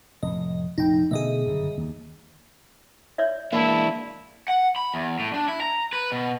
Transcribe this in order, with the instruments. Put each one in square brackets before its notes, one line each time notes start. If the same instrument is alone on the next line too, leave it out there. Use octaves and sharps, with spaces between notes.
[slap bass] F1 A2 [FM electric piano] D#5
[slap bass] F1 A#2 [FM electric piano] D#4 G5
[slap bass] B2 D3 A3 [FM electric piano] G#4 D#5 E5
[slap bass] G1 F#2 C#3
D#2
[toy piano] C#5 D5 E5
[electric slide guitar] E3 G#3 D4 [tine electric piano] A#3 A5 [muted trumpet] E4
[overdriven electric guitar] F#5
B5
E2
A2
D4
E4
A#5
B4
B2